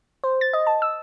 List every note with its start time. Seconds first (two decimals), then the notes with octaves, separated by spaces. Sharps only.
0.24 C5
0.41 A6
0.53 D#5
0.67 A5
0.82 E6